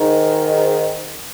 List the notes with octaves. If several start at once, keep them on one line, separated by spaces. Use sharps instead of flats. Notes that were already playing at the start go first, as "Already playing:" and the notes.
Already playing: G#2 D#3